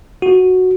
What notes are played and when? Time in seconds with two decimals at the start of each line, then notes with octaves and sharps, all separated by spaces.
0.22 F#4